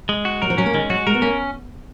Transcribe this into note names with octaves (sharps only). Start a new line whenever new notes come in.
G#3
F#4
F#3 A#4
F3
F#3 C#4
A#3
D#3 G#3
F#3 F#4
G#3 A#4
B3
A#3 C#4